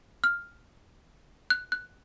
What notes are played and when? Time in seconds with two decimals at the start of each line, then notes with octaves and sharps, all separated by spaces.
0.24 F6
1.50 F#6
1.72 F#6